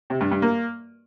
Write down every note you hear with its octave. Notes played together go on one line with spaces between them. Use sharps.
C3
G2
G2
A#3